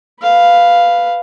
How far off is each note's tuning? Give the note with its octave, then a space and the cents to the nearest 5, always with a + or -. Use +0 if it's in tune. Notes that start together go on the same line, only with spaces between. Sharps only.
B4 +0 F5 +0